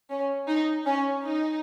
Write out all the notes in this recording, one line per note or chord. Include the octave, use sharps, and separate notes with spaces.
C#4
D#4
C#4
D#4